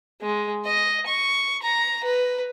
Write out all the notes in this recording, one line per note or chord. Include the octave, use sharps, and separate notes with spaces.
G#3
D#5
C#6
A#5
B4